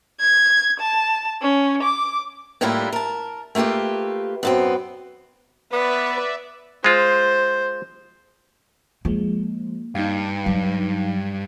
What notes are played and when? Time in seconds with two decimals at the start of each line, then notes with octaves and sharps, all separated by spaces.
0.20 G#6
0.80 A5
1.41 C#4
1.83 D6
2.61 A2 G3 A#3 D4 E4 F4
2.93 A#4 A5
3.55 A3 A#3 F4 G4 B4
4.43 F#2 B3 C4
5.73 B3 B4 D5 E5
6.84 G#3 F4 C5
9.05 F3 G#3 A#3
9.95 G2 D#4 F5
10.46 F#3